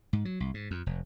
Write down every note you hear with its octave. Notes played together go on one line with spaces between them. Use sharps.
G#2
F#3
C2
G#2
F2
F1